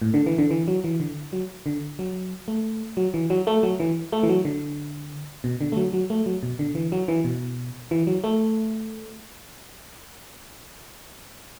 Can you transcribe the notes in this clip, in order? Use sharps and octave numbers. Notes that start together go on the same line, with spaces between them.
A2
D3
E3
D3
E3
F#3
E3
D3
F#3
D3
F#3
A3
F#3
E3
F#3
A3
F#3
E3
A3
E3
F#3
D3
B2
D3
A3
F#3
F#3
A3
F#3
B2
D3
E3
F#3
E3
B2
E3
F#3
A3